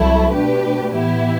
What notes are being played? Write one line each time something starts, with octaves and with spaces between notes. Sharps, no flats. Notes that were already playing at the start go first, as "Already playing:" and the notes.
Already playing: C2 C3 F#3 A3 E4
B2 A3 D4 G4 B4
A2 E3 B3 E4 G4